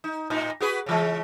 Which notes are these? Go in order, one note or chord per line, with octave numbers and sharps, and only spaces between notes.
D#4
A2 D#4
F#4 G#4 B4
C#3 E3 G#3